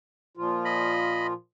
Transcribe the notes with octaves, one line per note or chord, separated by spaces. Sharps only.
A#2 F3 F4
D#5 B5